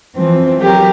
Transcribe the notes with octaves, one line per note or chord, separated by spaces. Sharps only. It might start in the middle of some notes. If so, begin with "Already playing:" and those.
E3 F3 C4
F#3 G4 A#4